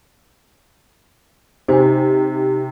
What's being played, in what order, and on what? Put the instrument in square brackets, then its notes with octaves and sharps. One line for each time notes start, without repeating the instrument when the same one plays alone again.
[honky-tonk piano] C3 [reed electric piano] D#4 G4 [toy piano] C5 G#5